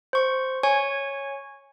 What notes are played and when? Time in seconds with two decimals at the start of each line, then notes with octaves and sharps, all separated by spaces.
0.13 C5 C#6
0.63 C#5 G#5 C#6